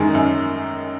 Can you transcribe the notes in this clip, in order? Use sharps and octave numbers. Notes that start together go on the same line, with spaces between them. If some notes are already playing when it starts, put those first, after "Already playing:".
Already playing: F#2 D#3 G#3
F#2